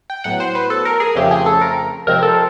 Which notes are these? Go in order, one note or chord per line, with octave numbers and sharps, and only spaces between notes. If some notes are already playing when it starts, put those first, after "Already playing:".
G5
A2 F#3 B3 F#5
C5
B4
A4
A#4
G#4
F2 C#3 F3 A3 C4 G4
G#4
A4
A#4
C3 F3 G#3 C4 A#4
A4